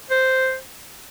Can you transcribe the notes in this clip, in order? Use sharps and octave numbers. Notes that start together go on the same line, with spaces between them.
C5